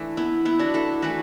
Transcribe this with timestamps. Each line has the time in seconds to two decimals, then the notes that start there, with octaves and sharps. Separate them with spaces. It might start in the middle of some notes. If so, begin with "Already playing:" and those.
Already playing: E3 A3 D4
0.17 B3 E4
0.45 B3 E4
0.59 D4 F#4
0.74 E4 A4
1.02 E3 A3 F#4 B4